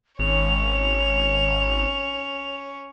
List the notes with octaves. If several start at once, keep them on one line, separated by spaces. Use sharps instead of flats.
G#1 C#4 C#5 F7